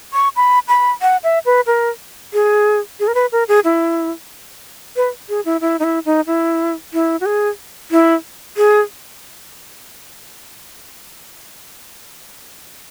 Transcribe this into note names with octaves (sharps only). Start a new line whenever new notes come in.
C#6
B5
B5
F#5
E5
B4
A#4
G#4
G#4
A#4
B4
A#4
G#4
E4
B4
G#4
E4
E4
D#4
E4
D#4
E4
E4
F#4
G#4
E4
G#4